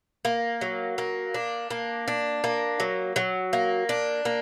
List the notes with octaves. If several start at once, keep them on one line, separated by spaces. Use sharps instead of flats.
A#3
F#3
A#3
D4
A#3
D4
A#3
F#3
F#3
A#3
D4
A#3